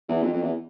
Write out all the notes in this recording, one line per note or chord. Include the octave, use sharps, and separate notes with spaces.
E2
F2
F2
E2